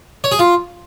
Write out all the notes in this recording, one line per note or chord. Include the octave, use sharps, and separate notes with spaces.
C#5
G#4
F4